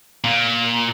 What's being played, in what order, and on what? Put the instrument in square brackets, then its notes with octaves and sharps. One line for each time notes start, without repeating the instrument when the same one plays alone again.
[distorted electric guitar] A#2